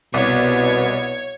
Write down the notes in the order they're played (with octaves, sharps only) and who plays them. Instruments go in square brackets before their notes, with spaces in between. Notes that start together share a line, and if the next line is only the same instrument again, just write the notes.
[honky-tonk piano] C2 [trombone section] B2 [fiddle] C#5